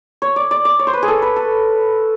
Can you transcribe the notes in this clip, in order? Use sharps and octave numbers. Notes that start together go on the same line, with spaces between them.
C#5
D5
D5
D5
C#5
C5
B4
G#4
A4
B4
A4